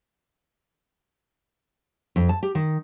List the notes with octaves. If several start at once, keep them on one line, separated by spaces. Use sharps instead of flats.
F2
A5
G4
D#3